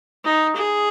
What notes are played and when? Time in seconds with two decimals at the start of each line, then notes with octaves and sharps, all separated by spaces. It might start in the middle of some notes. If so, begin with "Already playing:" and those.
0.24 D#4
0.56 G#4